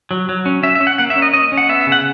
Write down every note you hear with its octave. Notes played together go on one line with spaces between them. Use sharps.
F#3
F#3
C#4
C#4 E5
E5
C#4
F#5
A#3 F#5
E5
C#4
D#5
C#4 D#5
C#4
F#5
B3 E5
E5
C#3
F#5